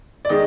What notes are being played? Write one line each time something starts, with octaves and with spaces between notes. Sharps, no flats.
D5
D#3 G#3 D#5